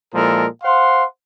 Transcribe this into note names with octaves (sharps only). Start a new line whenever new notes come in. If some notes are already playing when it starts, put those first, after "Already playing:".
A#2 F3 G#3 E4 A4 A#4
C5 F5 F#5 C6